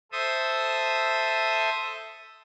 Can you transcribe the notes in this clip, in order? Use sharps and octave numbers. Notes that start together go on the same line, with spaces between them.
A4 C5 E5 D#6